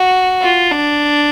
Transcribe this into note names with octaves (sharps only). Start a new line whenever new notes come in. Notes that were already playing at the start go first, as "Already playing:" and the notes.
Already playing: F#4
F4
D4